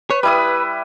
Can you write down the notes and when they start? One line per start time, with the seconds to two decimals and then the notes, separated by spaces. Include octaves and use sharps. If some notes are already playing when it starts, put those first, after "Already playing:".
0.10 B4 C#5
0.23 G3 E4 B4 D#6